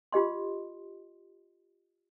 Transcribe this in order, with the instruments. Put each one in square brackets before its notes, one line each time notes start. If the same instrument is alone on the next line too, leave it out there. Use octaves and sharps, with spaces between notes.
[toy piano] F4 G4 D#5 C6